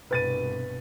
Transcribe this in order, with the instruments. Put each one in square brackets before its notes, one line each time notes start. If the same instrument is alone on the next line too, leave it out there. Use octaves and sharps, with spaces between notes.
[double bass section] C2 G2 B2 [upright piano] B4 A6 D#7